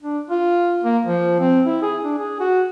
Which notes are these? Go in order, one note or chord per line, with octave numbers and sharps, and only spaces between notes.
D4
F4
A#3
F3
C4
E4
G#4
D4
G#4
F#4